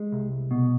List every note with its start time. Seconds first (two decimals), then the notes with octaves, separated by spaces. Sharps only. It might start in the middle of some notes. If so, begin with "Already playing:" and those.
Already playing: G#3
0.12 C2
0.51 B2